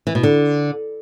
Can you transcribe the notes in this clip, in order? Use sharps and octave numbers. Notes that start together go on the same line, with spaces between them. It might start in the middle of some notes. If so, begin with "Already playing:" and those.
E3
B2
D3